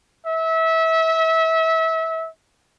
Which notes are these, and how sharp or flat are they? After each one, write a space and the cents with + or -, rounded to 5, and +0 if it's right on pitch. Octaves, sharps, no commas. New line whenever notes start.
E5 -25